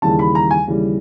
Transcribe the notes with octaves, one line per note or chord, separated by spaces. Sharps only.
D#2 C#3 E3 G3 A5
B5
A#5
G#5
D#2 C#3 E3 G3